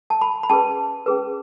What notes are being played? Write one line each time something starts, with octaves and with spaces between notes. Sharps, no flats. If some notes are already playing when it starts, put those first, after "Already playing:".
A5
B5
B5
C#4 G#4 B4 A5
C#4 G#4 B4